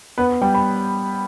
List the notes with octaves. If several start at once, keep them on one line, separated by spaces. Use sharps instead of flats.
B3 B4
G3 G5
B5